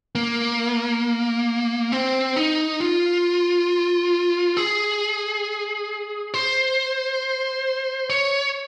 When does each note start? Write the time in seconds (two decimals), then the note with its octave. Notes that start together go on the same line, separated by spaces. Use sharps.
0.15 A#3
1.92 C4
2.36 D#4
2.80 F4
4.57 G#4
6.34 C5
8.10 C#5